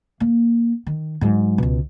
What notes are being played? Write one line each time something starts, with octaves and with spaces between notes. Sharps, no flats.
A#3
D#3
G#2 F#3
C#2 B2